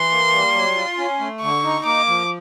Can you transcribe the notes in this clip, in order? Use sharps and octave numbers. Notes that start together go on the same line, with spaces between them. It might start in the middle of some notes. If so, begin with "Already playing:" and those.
Already playing: E3 C6
A#3
G3
F#3
F4
C#4
A3
D3 C#6
D#4
A#3 D6
F3